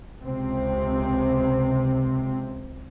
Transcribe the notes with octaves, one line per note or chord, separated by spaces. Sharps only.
C#2 C3 C4